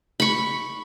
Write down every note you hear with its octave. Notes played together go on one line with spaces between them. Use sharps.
B5 C#6